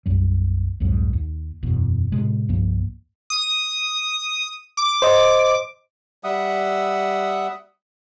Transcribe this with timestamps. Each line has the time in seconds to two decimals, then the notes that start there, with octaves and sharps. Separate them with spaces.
0.06 B1 F#2 G3
0.80 C2 F2 G#2 F#3
1.13 D#2
1.63 F#1 E2 B2
2.12 A2 C3 G#3
2.49 C2 G2 F3 A#3
3.30 D#6
4.77 D6
5.02 C5 D#5
6.24 G3 E5 F#5 D#6